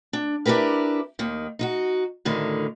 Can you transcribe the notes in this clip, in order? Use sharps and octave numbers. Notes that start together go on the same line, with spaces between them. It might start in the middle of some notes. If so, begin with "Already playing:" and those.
D4
D4 E4 G4 A#4 B4
D#2 D#3
D#4 F4 F#4
D2 A2 D3 D#3